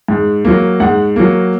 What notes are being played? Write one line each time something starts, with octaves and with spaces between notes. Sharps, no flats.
G#2
F#3 A#3
G#2 F#5
F#3 A#3